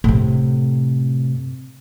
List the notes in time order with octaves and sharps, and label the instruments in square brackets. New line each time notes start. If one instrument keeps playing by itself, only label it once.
[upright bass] A2 C3